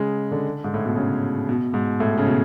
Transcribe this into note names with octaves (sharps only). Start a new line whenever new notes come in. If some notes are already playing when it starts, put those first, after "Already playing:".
Already playing: C#3 G#3
D3
G#2
A2
B2
C#3
B2
G#2
A2
C#3
B2